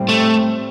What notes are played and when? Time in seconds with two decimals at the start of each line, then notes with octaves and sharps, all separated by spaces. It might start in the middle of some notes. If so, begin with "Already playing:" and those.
Already playing: A2 G3 C4
0.09 A3